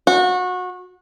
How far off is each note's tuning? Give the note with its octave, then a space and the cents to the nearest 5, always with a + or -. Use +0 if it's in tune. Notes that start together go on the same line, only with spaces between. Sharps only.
F#4 -25